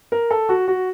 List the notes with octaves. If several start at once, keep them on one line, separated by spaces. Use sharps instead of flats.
A#4
A4
F#4
F#4